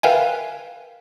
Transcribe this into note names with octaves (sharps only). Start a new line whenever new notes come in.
A#4 B4 E5 F5 G5 G#5